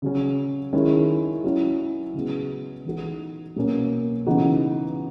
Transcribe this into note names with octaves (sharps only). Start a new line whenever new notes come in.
C#3 F#3 C#4
D#3 G#3 C#4 E4
F#3 C#4 E4
C#3 G#3 B3
E3 G#3 D#4 F#4
B2 F#3 A#3 C#4
C#3 E3 B3 D#4 F#4